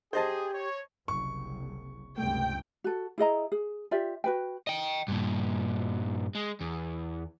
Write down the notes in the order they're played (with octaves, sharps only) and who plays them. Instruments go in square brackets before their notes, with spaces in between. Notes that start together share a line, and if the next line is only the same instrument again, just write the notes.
[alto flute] G4 [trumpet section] G#4 [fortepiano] C5 D#5 A5
[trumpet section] C#5
[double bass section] F#1 C2 [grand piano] C#6
[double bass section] C#2 G2 C3 [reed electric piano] A3 [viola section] G5
[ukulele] F#4 A4
E4 G#4 D#5 A#5
G#4
F4 G4 D5 E5
F#4 B4 G5
[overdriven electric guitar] D#5 G5
G2 A#2
G#3
E2